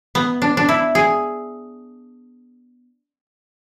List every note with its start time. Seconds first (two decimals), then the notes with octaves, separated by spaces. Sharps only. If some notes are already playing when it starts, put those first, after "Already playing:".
0.15 B3
0.42 D4
0.57 D4
0.69 E4
0.95 G#4